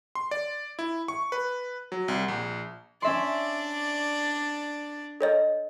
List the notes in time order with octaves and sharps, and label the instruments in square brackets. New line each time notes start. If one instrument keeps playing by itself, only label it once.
[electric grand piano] C6
D5
E4
C#6
B4
F#3
C2
A#1
[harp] C#4 E5 C6 [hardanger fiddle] D4 D5
[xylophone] A4 C#5 D#5